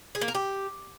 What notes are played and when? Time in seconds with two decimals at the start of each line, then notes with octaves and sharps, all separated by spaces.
0.15 G#4
0.21 A#3
0.28 A#4
0.35 G4